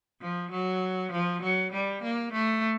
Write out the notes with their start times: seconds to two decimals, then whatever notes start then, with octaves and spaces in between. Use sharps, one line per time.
0.21 F3
0.51 F#3
1.12 F3
1.42 F#3
1.73 G3
2.03 A#3
2.33 A3